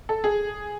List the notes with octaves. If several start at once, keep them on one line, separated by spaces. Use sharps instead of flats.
A4
G#4